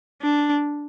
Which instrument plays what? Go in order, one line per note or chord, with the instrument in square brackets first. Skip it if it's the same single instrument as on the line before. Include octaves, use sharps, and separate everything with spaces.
[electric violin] D4